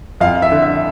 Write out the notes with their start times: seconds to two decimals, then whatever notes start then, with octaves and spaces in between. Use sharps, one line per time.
0.20 F2 F5
0.42 E5
0.52 D3
0.62 E5